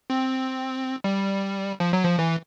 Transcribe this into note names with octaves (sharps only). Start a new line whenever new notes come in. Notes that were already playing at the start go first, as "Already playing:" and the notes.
C4
G3
F3
F#3
F3
E3